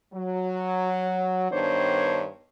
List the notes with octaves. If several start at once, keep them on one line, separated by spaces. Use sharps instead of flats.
F#3
G2 D#3 B3 D4 C5 C#5